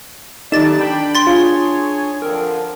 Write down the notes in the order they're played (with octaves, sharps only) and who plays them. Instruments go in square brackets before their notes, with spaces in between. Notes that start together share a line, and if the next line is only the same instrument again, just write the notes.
[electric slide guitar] D#3 G4 A4 [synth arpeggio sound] D#4 [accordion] D5 A5 [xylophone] A6 E7
[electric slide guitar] D4 [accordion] G5 B5
[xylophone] C6 A6
[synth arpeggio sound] F4 [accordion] G#4 C#5
[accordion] D3 F3 C4 [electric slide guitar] A#4